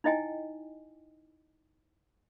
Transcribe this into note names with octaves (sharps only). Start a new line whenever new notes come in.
D#4 E4 D#5 G5 G#5